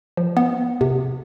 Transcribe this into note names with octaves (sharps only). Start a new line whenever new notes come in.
F3
B3
C3